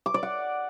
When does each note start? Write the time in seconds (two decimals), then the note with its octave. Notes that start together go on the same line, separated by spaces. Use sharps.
0.06 D6
0.14 D5
0.23 F#5